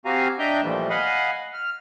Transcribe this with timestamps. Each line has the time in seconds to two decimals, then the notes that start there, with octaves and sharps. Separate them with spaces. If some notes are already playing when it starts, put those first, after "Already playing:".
0.05 C4 F#4 G4 F5 G#5 A#5
0.39 D4 D#5 E5 G5 A#5 G6
0.62 A#2 E3 F3 G3 A3
0.90 D#5 F5 F#5 G#5 B5
1.54 F6